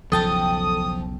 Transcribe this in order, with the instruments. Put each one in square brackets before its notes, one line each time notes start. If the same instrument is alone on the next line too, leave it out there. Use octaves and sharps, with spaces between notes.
[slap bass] B1 E2 C#3 [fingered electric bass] F3 [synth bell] A4 G5 A5 [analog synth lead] D#6